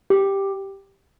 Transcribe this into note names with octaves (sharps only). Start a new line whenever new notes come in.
G4